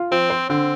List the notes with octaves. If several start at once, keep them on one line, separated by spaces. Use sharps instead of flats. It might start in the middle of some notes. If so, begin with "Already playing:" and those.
Already playing: F4
F3 C4
C5
D3 C4